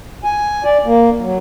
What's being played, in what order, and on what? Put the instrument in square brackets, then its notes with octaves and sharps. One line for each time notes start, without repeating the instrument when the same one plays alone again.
[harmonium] G#5
D5
A#3
F#3